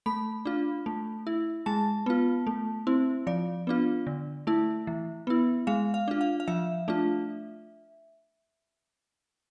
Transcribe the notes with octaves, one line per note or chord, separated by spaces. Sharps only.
A3 B5
D4 F4
A3
E4
G#3 A5
B3 F4
A3
C4 E4
F3 D5
B3 D4 F4
D3
A3 E4
E3
B3 E4
G#3 F5
F5
D4 F4
F5
F5
F3 E5
A3 D4 F4